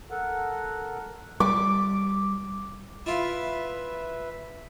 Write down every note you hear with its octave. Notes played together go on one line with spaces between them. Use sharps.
A4 A#4 F#5
G3 D6
E4 F4 B4 E5